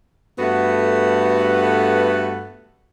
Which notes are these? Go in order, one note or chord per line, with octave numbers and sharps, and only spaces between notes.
G2 A3 B3 F#4 A4 B4